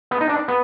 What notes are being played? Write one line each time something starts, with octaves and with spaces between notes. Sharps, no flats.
B3
D#4
D4
B3